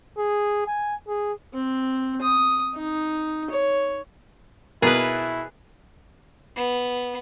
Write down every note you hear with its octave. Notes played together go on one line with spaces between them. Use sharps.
G#4
G#5
G#4
C4
D#6
D#4
C#5
B2 E4 G#4 A#4 B4
B3